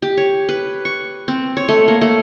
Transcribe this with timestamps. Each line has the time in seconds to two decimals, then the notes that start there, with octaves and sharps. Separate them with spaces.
0.02 G4
0.17 C#5
0.49 B4
0.85 C#6
1.28 C4
1.57 C#5
1.68 A3
1.88 A#3
2.01 A3